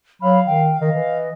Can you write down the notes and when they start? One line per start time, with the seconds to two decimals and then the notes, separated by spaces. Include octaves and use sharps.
0.22 F#3 F5 B5
0.46 D#3 G5
0.81 D#3 D#5
0.92 E3